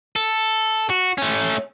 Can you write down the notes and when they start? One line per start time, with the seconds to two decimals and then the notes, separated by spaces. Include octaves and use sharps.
0.16 A4
0.90 F#4
1.18 A3 C#4